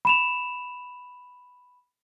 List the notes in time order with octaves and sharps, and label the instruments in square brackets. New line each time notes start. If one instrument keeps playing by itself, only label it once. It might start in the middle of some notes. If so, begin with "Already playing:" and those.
[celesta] B5 E7 F7